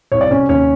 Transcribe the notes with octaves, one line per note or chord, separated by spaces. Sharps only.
C2 C#5
D5
C3 C#4 C#5
D#2 C#4 C#5